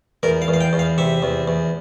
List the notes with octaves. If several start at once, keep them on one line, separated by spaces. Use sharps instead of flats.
E2 A#4
F5
E2
F5
G5
E2
F5
C3 E5
E2
E2